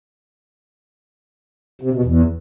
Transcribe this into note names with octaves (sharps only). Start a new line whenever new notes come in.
C3
B2
E2